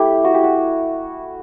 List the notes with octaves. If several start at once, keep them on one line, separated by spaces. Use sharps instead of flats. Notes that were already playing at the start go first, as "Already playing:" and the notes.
Already playing: A3 E4 G4
F#4
G4
F#4